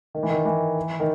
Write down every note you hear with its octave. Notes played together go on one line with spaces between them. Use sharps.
D#3
E3
D#3
E3
D#3